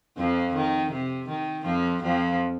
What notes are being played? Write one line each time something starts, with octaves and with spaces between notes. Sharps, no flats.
F2 F3
D#3
C3
D#3
F2 F3
F2 F3